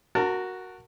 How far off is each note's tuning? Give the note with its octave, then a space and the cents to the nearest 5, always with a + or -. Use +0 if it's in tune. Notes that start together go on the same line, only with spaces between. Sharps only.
F#4 +0 A#4 +0 A5 +30